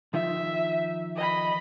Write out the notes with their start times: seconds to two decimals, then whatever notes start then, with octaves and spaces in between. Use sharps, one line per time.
0.14 D#3 F3 D#4 E5
1.16 D#5 B5